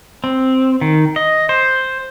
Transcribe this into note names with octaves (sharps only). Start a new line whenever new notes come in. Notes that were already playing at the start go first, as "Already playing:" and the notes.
C4
D#3
D#5
C5